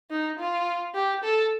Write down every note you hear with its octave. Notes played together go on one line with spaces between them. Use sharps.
D#4
F4
G4
A4